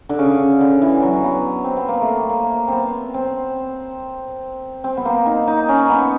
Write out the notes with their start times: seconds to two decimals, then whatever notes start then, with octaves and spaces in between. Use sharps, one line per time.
0.09 D3
0.19 C#3
0.61 D3
0.82 E3
1.02 F#3
1.24 B3
1.64 C4
1.77 B3
1.88 A#3
2.01 A3
2.29 A#3
2.68 B3 C4
3.14 C4
4.84 C4
4.97 B3
5.05 A#3
5.26 D#4
5.47 D#4
5.69 C#4
5.90 B3